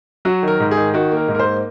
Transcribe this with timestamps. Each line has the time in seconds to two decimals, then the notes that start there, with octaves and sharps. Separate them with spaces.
0.25 F#3 F#4
0.43 D#3
0.48 A#4
0.60 G#2
0.71 G#4
0.76 D#3
0.94 D#3 F#4
1.12 A#3
1.17 A#4
1.28 G#2
1.35 A#4
1.39 C5
1.45 A#3